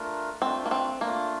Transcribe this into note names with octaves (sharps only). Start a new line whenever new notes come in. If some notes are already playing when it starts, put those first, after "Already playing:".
Already playing: A3 D4 F4 A#4
A3 C4 D4 F4
A#3
C4
A3 A#3 D4 F4